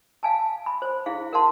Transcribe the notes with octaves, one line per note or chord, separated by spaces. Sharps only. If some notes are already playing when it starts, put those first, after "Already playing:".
F5 G#5 A5
B5
C5
E4 G#4 F5
A#4 F5 F#5 A5 C6